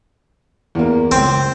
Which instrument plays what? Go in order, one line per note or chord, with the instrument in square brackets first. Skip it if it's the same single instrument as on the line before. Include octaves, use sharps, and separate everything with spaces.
[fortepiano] E2 A#3
[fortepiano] C#2 C5 [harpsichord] C4